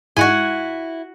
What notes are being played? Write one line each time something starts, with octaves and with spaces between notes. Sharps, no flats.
G#2 G#3 E4 F#4 F#5 G#5